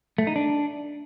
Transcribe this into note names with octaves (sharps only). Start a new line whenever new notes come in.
A3
D#4
D4